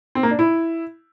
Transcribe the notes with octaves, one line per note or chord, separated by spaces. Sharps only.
C4
A#3
D4
E4